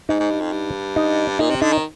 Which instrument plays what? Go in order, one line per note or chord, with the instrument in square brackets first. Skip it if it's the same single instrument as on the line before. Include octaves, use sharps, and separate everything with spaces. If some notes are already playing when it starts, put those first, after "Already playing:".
[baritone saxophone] G#2 [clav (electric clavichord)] D#4
[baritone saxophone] G#2
G2
F2
G2
[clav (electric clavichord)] D#4
[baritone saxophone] A#2 [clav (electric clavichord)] D#4
[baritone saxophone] C3
[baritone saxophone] D3 [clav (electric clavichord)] D#4
[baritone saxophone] D#3